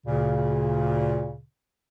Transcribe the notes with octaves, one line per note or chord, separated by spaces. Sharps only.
D2 A#2 C#3